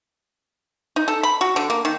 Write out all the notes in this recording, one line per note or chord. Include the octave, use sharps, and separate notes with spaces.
D#4
A4
B5
F#4
D3
A#3
D#3